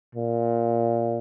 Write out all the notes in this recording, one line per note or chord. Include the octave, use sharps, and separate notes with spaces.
A#2